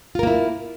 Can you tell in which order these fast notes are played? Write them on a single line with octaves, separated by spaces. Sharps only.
F4 A#4 A#3 E4